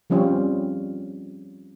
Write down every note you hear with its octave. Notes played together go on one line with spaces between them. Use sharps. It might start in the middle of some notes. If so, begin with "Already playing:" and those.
F3 G3 C4 C#4 F4